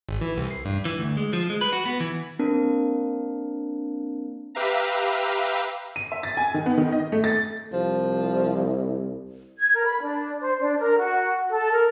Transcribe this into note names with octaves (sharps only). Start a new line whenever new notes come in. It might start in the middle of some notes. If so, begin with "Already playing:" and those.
G#1
E3
C2
C7
G2
E3
D2
G#3
F3
G#3
B4
F#4
B3
E3
A#3 C4 D4 A#4
G4 B4 E5 F5 A#5
D#7
E5
A6
G#5
D#3
B3
D#3
D#5
A3
A6
C2 F3
G#6
A#4
B5
D4
C5
D4
A#4
F#4
A4
A#4